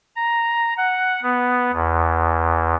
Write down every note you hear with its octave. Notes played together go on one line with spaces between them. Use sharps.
A#5
F#5
B3
E2